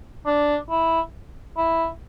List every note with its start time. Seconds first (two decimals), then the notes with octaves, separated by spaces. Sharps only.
0.26 D4
0.70 E4
1.57 E4